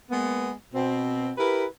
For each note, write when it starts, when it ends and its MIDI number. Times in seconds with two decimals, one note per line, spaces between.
0.10 0.51 56
0.10 0.51 58
0.10 0.51 59
0.74 1.31 47
0.74 1.31 60
1.38 1.65 64
1.38 1.65 67
1.38 1.65 70
1.38 1.65 71